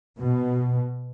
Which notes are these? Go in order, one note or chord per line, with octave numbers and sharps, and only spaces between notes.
B2